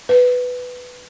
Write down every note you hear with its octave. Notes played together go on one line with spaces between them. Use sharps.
B4